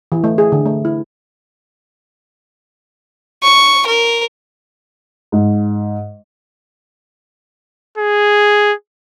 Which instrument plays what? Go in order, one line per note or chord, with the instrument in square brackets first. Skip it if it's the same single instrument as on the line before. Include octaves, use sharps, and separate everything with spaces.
[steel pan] E3
A3
G#4
D3
A3
E4
[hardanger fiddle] C#6
A#4
[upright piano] G#2
[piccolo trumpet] G#4